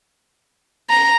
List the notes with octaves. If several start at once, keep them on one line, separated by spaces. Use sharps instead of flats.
A#5